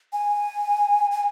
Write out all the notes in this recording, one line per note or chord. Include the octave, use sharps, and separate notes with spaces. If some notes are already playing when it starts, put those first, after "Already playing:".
G#5
G#5